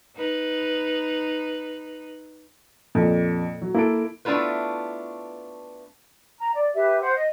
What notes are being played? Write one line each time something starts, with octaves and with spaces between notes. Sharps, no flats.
D#4 B4
F2 A#2
F#3
A#3 E4 A4 D7
A3 B3 D4 E4 F4 B4
A#5
D5
G4 B4 E5
C5 F#5
D#5